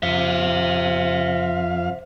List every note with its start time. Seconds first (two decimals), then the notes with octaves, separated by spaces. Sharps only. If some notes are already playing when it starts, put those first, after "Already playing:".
0.03 F2 C5 E5 F5